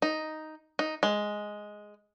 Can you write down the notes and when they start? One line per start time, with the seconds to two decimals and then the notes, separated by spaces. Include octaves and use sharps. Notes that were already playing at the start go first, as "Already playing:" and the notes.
0.02 D#4
0.79 D#4
1.03 G#3